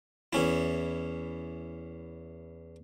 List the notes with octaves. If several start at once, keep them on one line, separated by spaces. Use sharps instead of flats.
E2 C#4 E4